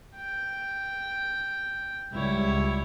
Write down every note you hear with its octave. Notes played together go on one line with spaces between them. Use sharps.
G5
C#2 G3 E4 C#5